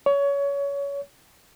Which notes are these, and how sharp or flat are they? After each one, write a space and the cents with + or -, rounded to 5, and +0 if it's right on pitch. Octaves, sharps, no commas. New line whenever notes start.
C#5 +25